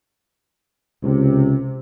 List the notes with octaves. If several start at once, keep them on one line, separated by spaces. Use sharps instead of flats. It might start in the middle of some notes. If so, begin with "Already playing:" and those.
C#2 C3